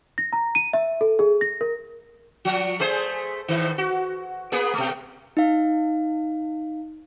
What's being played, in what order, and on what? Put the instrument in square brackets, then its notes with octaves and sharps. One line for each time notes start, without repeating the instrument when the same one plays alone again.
[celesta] A#6
A#5
D#7
E5
A4
G#4
A#6
A#4
[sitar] F3
A3 G#4 C5
A2 D#3
F#4
A#3 B3 G#4
B2 A3
[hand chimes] D#4 F5